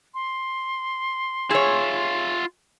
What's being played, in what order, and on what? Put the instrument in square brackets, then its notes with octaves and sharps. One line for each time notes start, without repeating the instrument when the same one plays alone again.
[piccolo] C6
[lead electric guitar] F4 E5 [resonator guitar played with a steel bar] G#4 C#5